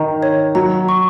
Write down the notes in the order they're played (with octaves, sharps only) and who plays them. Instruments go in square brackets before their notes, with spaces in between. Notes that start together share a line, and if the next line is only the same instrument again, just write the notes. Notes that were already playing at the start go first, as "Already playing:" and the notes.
Already playing: [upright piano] D#3 [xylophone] A#5
[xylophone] C#5
[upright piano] F#3 [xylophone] A#5
[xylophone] C#6